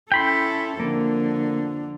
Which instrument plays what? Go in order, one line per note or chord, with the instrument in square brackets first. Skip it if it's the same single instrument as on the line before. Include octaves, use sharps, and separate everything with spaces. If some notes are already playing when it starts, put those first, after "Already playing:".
[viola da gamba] C#4 E4 A4 [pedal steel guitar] G5 B5 C6
[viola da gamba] F2 D3 [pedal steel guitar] A#3